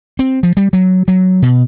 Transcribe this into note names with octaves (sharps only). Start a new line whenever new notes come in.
C4
F3
G3
F#3
F#3
B2